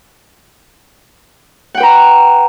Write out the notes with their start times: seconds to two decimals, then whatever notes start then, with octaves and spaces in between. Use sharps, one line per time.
1.75 F#5
1.77 G5
1.80 B4
1.83 A#5